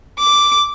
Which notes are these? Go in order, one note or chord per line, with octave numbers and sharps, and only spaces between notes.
D6